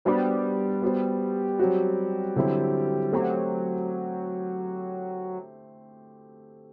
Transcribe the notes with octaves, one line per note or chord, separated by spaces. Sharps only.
G3 B3 D4 F#4 C5
B3 F#4 C5
F#3 C4 F#4
D3 F#3 C4 E4 A4
F#3 A3 C4 G4